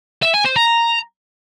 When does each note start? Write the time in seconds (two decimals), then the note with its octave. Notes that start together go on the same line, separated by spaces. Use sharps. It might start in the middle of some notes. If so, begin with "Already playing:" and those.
0.23 E5
0.34 G#5
0.45 C5
0.56 A#5